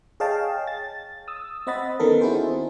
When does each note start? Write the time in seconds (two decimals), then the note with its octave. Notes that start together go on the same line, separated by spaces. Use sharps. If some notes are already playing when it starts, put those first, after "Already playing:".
0.20 G#4 C#5 D#5 F5 G5 A5
0.67 A6
1.28 D#6 E6
1.67 C4 C5 D#5 F#5 B5 A6
2.00 D#3 B3 C#4 A4 A#4
2.21 C4 D#4 E4 F#4 G#4 C5